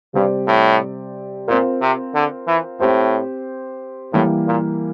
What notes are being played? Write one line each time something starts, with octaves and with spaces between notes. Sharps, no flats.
G2 C3 G3 C4 G4 D5
A2
A#2 C4 F4 A#4
C3
D3
E3
A2 C4 G4 C5
A2 E3 G3 A#3 E4 G4
A#2